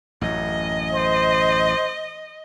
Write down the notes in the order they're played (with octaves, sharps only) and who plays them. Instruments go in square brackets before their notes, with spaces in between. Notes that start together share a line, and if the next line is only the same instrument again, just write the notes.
[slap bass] A1 F#2 [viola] D#5
[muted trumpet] C5